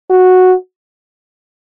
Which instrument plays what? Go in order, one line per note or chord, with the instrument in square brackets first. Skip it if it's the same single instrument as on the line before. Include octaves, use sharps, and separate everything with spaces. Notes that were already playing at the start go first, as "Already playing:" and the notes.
[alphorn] F#4